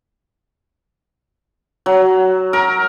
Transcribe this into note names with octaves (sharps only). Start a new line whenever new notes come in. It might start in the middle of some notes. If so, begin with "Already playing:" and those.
F#3
A#4